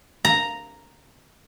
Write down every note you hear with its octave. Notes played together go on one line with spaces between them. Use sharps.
A#5